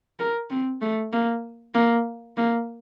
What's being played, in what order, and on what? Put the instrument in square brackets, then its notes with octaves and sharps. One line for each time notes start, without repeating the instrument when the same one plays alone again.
[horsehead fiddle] A#4
C4
A3
A#3
A#3
A#3